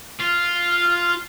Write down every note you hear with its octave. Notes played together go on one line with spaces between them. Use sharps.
F4 F6